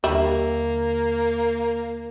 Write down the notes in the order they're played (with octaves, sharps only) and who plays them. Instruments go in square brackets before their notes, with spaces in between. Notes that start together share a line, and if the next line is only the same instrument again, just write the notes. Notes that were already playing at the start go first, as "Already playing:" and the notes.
[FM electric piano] D#2 D3 [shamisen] G3 E5 [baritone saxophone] A#3